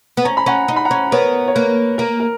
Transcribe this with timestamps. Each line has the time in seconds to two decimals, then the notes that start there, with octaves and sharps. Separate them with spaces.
0.17 B3
0.25 C#4 A#5
0.37 B5
0.46 C#4 F#5 A#5
0.68 D#4 A#5
0.76 B5
0.85 F#5 A#5
0.91 C#4
1.11 B3 A#4 C#5
1.47 C#5
1.55 A#3 B4
1.98 A#3 A#4
2.20 A#4